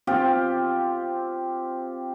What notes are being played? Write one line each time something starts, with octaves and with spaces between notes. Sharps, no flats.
C4 F4 G4